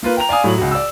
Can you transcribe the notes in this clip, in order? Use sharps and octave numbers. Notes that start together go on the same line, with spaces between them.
A#3 F4 B4
G5 A#5 F7
D5 F5 G#5 D#6
A2 F#3 F#7
C#2 F#4
D5 E6